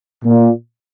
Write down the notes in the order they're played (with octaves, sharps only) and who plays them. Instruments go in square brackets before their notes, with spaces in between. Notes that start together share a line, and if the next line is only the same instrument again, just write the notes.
[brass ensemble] A#2